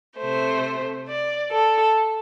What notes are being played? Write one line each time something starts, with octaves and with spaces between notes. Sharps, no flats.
C3 A3 C5
D5
A4